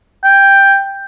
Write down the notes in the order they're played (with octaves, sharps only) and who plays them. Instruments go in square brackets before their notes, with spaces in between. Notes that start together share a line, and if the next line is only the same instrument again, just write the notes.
[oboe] G5